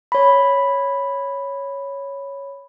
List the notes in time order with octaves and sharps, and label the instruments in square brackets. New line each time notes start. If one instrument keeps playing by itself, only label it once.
[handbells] C#5 B5